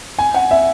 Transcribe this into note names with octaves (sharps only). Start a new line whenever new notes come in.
G#5
F#5
E5